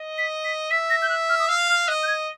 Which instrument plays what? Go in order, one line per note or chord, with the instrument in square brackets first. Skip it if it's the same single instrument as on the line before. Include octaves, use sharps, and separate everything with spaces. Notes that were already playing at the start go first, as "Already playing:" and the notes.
Already playing: [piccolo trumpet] D#5
[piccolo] B6
B6
[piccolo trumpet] E5 [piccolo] B6
[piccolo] A#6
G6
F#6
F6
D#6
[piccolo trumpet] F5 [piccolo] E6
[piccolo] F6
[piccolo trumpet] D#5 [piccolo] F#6
[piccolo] G6
G#6